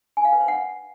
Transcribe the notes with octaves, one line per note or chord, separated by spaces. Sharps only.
G#5
F5
B4
C5
F#5